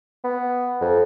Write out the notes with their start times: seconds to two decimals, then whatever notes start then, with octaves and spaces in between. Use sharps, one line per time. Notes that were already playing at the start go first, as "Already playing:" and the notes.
0.24 B3
0.81 F2